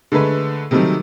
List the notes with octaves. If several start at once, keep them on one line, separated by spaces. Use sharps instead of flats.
D3 G#3 A3 B4
C3 D#3 F#3 G3 A3